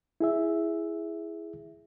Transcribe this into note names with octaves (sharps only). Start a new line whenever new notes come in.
E4 G#4 E5